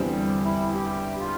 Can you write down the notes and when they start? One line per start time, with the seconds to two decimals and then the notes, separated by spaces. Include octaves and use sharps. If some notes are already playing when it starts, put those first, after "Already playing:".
Already playing: E2 D3 G3 C4
0.44 E4
0.75 G4
1.20 F4